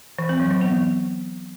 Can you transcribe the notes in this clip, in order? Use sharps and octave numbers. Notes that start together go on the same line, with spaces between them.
E3
C4
F#3
E3
B3